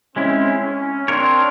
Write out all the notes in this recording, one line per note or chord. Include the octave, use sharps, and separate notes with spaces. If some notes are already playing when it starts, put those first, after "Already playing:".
G#3 C4 C#4 E4
C#4
C4 D4 F4 A#4 C#5